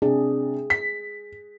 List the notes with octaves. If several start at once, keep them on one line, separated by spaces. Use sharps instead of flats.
C3 D4 G#4
B6